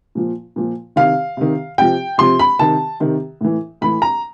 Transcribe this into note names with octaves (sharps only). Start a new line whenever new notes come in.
A#2 F3
A#2 F3
C3 D#3 F5
C3 D#3
C3 F3 G5
C3 F3 C6
B5
C3 D#3 A5
C3 D#3
A2 E3
A2 E3 B5
A#5